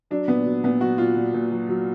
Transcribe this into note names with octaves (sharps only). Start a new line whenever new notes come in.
F#3 D4
A#2 B3
F#3
A#2 B3
F#3 F#4
A#2 F4
A#2
A#2
F#3
F#3